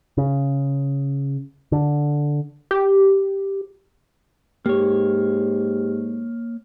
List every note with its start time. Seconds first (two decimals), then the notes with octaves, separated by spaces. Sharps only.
0.17 C#3
1.72 D3
2.71 G4
4.66 G#2 A#3 G4 C#5